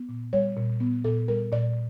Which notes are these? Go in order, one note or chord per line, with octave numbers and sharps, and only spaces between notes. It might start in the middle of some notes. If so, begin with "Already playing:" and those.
Already playing: B3
A#2
G3 C#5
A#2
B3
A#2 A4
G3 A#4
A#2 D5